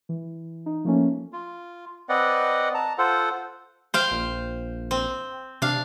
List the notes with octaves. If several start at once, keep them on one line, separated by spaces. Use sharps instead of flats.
E3
D#4
F3 A3 A#3 C#4
F4
C4 B4 D5 D#5 F#5
A5 A#5
F4 A4 C5 F#5
C5 F5 G5
A#1
C4
C3 D4 F5